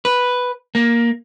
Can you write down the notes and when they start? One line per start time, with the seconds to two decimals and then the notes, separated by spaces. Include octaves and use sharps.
0.05 B4
0.75 A#3